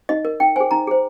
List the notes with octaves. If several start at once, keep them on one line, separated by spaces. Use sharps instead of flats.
D#4 D#5
A#4
D#4 G5
G#4 C5 G#5
D#4 A#5
G#4 C5